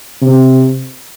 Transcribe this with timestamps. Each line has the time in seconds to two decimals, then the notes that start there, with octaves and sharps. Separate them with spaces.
0.22 C3